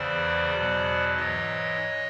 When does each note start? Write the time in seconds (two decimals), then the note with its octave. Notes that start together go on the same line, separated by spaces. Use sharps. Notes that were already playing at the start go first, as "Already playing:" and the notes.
Already playing: E2 C#3 E3 C5 D5
0.54 E2 B2 F#3
1.17 G#2 E3 C#5 D#5